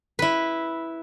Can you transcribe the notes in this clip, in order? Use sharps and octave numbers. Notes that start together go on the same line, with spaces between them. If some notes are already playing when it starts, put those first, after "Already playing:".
E4 B4